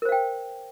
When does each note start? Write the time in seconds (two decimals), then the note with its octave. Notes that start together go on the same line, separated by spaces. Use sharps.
0.02 A#4
0.05 C5
0.09 F5
0.12 G5